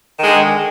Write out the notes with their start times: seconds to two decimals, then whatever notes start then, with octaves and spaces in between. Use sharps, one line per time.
0.19 D#3
0.22 G#3
0.24 D3